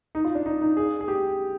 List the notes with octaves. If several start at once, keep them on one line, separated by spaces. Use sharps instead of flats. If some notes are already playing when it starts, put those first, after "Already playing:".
D#4
F4
D4
D#4
D#4
G#4
G#4
G4